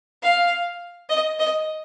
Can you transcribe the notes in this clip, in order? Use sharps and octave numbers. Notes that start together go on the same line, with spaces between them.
F5
D#5
D#5